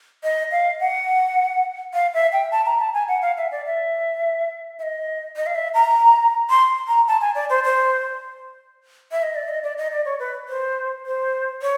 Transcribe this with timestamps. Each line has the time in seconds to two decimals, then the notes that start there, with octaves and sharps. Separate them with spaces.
0.23 D#5
0.51 F5
0.80 F#5
1.94 F5
2.14 E5
2.33 G5
2.52 A5
2.66 A#5
2.80 A5
2.94 G#5
3.08 F#5
3.22 F5
3.37 E5
3.52 D5
3.66 E5
4.79 E5
4.83 D#5
5.36 D#5
5.46 F5
5.55 E5
5.74 A#5
6.50 C6
6.88 A#5
7.07 A5
7.21 G#5
7.35 D5
7.50 C5
7.64 C5
9.12 E5
9.23 D#5
9.35 D5
9.48 D#5
9.63 D5
9.78 D#5
9.92 D5
10.05 C#5
10.20 B4
10.48 C5
11.06 C5
11.62 C#5